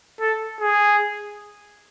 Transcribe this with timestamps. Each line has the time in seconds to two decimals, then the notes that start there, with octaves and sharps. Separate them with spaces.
0.21 A4
0.61 G#4